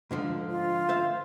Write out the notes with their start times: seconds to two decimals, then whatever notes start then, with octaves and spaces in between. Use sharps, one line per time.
0.11 G#2 D3 F3
0.50 F4
0.89 C5 E5 F5